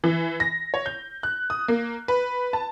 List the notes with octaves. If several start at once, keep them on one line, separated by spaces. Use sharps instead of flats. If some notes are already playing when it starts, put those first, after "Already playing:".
E3
A#6
C#5
G6
F#6
D#6
A#3
B4
A5